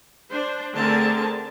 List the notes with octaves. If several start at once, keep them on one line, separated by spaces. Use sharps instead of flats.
D4 C5
D3 A3 C4 G#4 A#4 A5